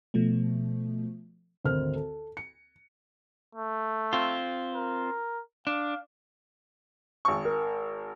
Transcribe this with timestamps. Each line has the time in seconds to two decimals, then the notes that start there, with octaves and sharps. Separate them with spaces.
0.14 B2 F3 A3
1.64 G#1 D2 A#4 C5 F6
1.95 A4
2.37 C#7
3.55 A3
4.13 C4 F4
4.75 A#4
5.67 D4 F5
7.25 G#1 C#6
7.45 A#4